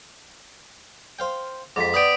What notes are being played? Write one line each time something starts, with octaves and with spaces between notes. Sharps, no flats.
C5 F5 G5
F2 G#2 D6 B6
B3 D5 G5 D#6 D7